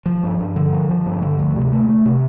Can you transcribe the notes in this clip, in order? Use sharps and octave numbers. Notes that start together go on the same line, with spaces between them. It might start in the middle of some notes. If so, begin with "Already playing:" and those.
F3
G2
G2
D3
F3
F3
G2
D3
D2
C3
A3
A3
C3